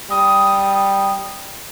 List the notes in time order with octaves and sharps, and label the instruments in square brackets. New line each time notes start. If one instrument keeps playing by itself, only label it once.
[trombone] G3 [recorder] D#6